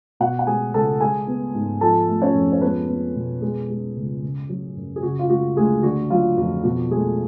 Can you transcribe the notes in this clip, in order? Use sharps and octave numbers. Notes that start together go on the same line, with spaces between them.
B2 F#4 F#5
F#5
G#3 G#4 G#5
C#2 A4 A5
G#3 G#4 G#5
B3
G#2
F3 A4 A5
A3
C#4 C#5
F2
C#5
G#3 B3 B4
B3
B2
B2 G#3 G#4
G#3
C#2
C#3
F#3
F#2
G#4
C#3 F#4
F4
G#3 F#4
D2 G#3 G#4
D3 F#4
F#3 F4
F2 F#4
B2 F#4
G#3 A3 G#4